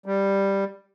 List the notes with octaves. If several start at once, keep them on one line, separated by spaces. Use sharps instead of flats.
G3